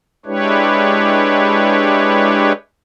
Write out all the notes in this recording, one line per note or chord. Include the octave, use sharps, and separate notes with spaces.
G#3 D4 E4 G4 B4 C#5